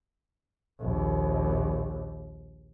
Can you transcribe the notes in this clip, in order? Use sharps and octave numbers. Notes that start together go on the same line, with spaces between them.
A#1 D#2